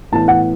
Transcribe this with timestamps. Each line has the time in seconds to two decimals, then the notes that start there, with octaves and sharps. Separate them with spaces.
0.12 A2 E3 B3 A5
0.28 F#5